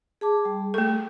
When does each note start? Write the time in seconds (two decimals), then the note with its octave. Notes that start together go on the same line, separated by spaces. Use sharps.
0.21 G#4 A5 D6
0.45 G3
0.74 A3 A4 C#6